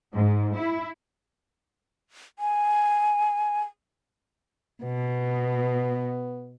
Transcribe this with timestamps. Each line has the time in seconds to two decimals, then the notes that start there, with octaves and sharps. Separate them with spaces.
0.14 G#2
0.57 E4
2.39 G#5
4.83 B2 B3